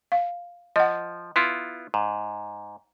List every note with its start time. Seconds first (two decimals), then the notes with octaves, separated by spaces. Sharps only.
0.12 F5
0.76 F3 D#5 F#5
1.36 B3 E4 F4 C6
1.94 G#2